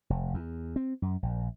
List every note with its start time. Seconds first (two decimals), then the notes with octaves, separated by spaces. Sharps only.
0.10 F1
0.34 E2
0.76 C4
1.02 F#2
1.23 A#1